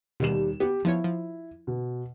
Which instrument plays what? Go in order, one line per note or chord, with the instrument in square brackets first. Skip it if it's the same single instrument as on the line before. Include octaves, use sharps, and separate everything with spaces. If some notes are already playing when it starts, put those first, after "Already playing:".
[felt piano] D#2 G3 E7 [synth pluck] B2 D#3
[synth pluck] B3 [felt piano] G4
[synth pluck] F3 B3 C#5 [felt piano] E4
[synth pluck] F3
[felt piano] B2